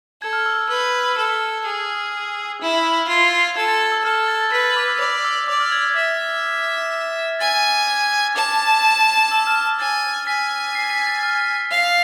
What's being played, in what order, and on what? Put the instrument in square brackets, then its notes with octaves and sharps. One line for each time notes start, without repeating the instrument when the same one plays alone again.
[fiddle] A4 [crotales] G#6
[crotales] F6
E6
[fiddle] B4 [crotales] E6
[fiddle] A4 [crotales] F6
[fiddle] G#4
E4
[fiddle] F4 [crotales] G#6
[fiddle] A4 [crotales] G#6
[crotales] A6
G#6
E6
[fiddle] A4 [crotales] F6
[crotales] G#6
A6
A6
[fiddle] B4 [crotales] B6
[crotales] A6
D6
E6
[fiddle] D5 [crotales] D6
[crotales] E6
[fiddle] D5 [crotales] D6
[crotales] F6
G#6
G#6
[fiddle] E5 [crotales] B6
[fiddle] G#5 [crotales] A6
[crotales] G#6
[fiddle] A5 [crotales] D6
[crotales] E6
F6
[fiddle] G#5 [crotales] A6
[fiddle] G#5 [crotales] B6
[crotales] C7
B6
A6
F6
[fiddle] F5